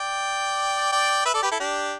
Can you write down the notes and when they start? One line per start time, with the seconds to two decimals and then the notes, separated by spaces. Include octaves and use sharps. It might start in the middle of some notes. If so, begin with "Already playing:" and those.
Already playing: D5 G5
0.92 D5 G5
1.25 B4 E5
1.34 A4 D5
1.42 G4 B4
1.51 E4 A4
1.60 D4 G4